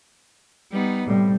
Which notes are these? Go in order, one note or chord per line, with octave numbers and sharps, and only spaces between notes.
G3 B3 D#4
A2 C3 G3